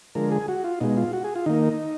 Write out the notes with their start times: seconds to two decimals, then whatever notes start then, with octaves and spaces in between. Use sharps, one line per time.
0.15 D3 F3 G#3 A#4
0.32 G#4
0.48 F#4
0.64 F4
0.80 B2 G#3 D#4
0.97 F4
1.13 F#4
1.24 G#4
1.36 F4
1.46 D#3 A#3 D#4